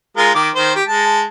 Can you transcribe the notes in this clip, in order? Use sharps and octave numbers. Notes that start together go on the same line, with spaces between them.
G#3 F4 A#4
D#3 D6
D#3 C5
G4
G#3 A5